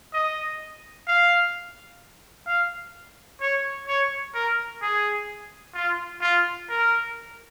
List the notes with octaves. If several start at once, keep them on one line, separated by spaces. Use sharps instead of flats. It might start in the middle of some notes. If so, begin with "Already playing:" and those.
D#5
F5
F5
C#5
C#5
A#4
G#4
F4
F4
A#4